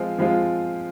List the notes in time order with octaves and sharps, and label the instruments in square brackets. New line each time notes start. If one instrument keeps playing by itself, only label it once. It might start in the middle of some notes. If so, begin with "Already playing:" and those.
Already playing: [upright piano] F3 G#3 C4 F4
F3 G#3 C4 F4